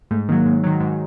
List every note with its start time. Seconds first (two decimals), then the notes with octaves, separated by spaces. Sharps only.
0.11 G#2 A3
0.29 D#3 F#3 A#3
0.46 G#2
0.64 D#3 F#3
0.80 G#2